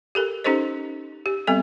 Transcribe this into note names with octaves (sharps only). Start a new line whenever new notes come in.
G4 A4 A#4
C#4 D#4 G4 A4 C5 D#5
G4
G3 B3 C4 A4 D#5